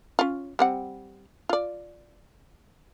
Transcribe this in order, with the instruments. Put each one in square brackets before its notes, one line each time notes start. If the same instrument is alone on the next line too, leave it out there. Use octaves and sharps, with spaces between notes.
[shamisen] C#4 F4
G3 C4 F#5
F4 D5